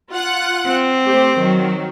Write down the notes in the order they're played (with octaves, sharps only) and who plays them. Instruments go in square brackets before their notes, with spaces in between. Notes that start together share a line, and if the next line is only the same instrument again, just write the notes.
[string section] F4 F#5 F#6
[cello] C4
[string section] A3 G4 C5
D#3 F#3